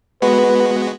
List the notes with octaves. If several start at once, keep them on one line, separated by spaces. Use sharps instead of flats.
G#3 B3 F#4 B4